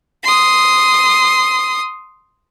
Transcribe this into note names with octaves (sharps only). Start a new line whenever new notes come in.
C6 D#6